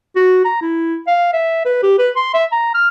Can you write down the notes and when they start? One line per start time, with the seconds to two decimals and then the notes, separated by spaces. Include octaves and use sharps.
0.16 F#4
0.45 A#5
0.61 E4
1.07 F5
1.33 E5
1.65 B4
1.83 G4
1.98 B4
2.16 C6
2.34 E5
2.52 A#5
2.74 F6